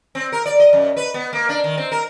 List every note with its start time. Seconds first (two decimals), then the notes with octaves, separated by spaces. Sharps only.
0.15 C4
0.32 A#4
0.46 D5
0.60 D#5
0.73 F#2
0.97 B4
1.14 B3
1.33 A#3
1.49 D4
1.64 D#3
1.78 C4
1.92 A#4